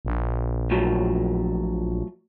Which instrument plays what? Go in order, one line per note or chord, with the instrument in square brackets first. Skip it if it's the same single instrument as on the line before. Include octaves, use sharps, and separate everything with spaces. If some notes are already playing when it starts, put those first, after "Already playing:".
[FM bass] A#1
[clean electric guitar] A2 F3 F#3